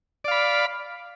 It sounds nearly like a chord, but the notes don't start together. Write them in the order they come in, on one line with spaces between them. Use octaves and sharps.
D5 F5 B5